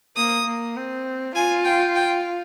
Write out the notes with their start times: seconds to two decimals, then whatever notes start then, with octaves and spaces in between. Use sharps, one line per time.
0.16 A#3 D#6
0.46 A#3
0.76 C4
1.35 F4 G#5
1.65 G5
1.95 G5